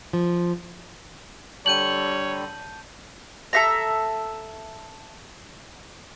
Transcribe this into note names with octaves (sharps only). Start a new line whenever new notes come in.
F3
D3 G3 C#5 A5 G6 D#7 F#7
A4 E5 A#5